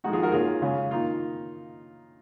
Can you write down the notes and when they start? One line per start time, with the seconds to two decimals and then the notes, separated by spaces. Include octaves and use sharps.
0.04 F2 D#3 G#3 D#4 F#4
0.13 F4 G#4
0.23 F#4 A#4
0.32 C3 D#3 A#3 C#4 F4 G#4
0.62 C#3 G#3 C#4
0.91 D#3 A#3 D#4 F4